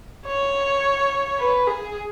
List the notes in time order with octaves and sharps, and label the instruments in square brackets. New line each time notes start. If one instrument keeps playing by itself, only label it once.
[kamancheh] C#5
B4
G#4